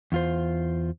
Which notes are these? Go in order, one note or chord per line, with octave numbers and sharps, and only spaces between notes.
E2 F4 C5